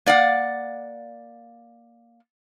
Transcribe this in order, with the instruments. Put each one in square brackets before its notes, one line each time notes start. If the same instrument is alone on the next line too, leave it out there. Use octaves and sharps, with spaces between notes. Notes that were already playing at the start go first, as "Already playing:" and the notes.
[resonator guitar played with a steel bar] A#3 D5 F5 F#5